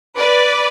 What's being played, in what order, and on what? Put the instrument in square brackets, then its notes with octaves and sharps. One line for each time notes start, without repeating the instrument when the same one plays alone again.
[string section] B4 D5